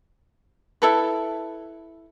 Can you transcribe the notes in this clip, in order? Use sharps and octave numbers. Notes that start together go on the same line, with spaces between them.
E4 A4 B4